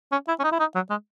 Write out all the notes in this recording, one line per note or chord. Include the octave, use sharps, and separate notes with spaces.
C#4
E4
C#4
D#4
E4
D#4
F#3
G#3